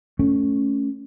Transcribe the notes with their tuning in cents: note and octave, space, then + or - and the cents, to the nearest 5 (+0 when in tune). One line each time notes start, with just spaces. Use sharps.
A3 +0 C#4 +0